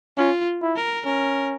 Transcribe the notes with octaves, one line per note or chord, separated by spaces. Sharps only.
C#4 F4
E4
A#4
C#4 A#4